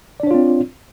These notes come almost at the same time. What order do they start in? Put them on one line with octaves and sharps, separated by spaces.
D5 D4 C#5 F4 C4